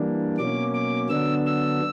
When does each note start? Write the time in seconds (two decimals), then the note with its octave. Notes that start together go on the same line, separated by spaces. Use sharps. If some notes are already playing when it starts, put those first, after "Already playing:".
Already playing: E3 G3 A#3 D4
0.38 B2 F#3 A#3 C#4 D6
0.74 D6
1.09 D3 F#3 B3 D4 E6
1.46 E6